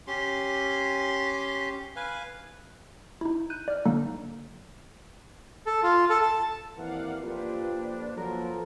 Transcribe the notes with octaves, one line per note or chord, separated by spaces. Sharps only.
C#4 G4 C6
B4 F5 G#5
D#4 E4
F#6 G6 D#7
D5 F6
D3 F#3 A#3 D4 D#4 A4
A4
F4
A4
A5
D#2 E3 C4 A#4 D5 F5 F#5
F3 A#3 D4 F4 G4 A4 B4 C5
F3 F#3 A4 A#4